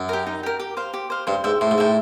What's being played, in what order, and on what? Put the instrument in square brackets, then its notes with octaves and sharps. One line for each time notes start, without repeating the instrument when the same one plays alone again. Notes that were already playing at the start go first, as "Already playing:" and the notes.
Already playing: [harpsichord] F#2
[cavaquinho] G4 A#4
D#4
G4 A#4
G4
C5 F5
G4
C5 F5
[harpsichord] G2 [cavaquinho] C5
[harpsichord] G#2 [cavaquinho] E5 G5
[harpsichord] A2 [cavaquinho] C5
[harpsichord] G#2
[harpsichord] A2 [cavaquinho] E5 G5